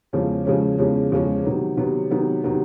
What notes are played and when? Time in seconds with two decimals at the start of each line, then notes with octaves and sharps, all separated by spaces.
0.13 E2 C#3 F3 G#3 C#4
0.45 E2 C#3 F3 G#3 C#4
0.78 E2 C#3 F3 G#3 C#4
1.11 E2 C#3 F3 G#3 C#4
1.44 C3 D#3 F#3 B3
1.77 C3 D#3 F#3 B3
2.10 C3 D#3 F#3 B3
2.44 C3 D#3 F#3 B3